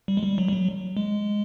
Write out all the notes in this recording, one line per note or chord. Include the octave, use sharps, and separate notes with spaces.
G3
G#3
G3
F#3
G3
F#3
G#3